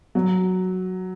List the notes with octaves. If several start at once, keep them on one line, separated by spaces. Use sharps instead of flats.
F#3